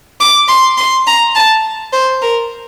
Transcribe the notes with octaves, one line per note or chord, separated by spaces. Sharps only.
D6
C6
C6
A#5
A5
C5
A#4